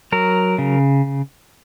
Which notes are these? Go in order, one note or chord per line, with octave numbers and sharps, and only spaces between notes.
F#3 A#4
C#3